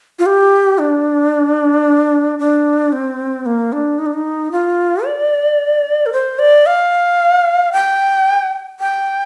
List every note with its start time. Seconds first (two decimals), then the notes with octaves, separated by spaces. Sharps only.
0.19 F4
0.26 G4
0.78 D4
2.39 D4
2.92 C4
3.46 A#3
3.73 D4
3.98 D#4
4.06 D4
4.13 D#4
4.52 F4
5.06 D5
6.06 A#4
6.13 C5
6.39 D5
6.66 F5
7.72 G5
8.80 G5